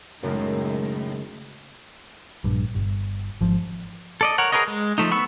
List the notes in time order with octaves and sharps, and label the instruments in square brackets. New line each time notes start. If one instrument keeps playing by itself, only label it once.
[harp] F#1 A#4 [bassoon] F#2 [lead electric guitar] A2 [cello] D#3 G#3
[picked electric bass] A#1 G2
G1
G#1 F3
[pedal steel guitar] A4 D5 D#5
A#4 C#5 F#5
G#4 A#4 B4 C#5 D#5
G#3
F3 A3 D#4
B3 B5 C#6 E6